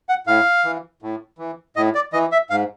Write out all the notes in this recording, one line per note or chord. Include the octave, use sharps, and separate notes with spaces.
F#5
A2 F5
E3
A2
E3
A2 D#5
D5
E3 D#5
E5
G#2 F5